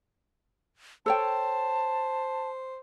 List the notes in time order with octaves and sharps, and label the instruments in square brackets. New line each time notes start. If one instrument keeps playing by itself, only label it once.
[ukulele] A4 C#5 G5 [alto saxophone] C5 [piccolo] A5